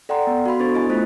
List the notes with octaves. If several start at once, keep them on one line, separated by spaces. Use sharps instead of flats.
A4 D5 F#5 G5 A#5 C6
B3
F#4 F5 B5 C6
B3 D4 A4 C5 C#6 A6
E4 D#5 G#5
A3 F4 C5 F#6 A6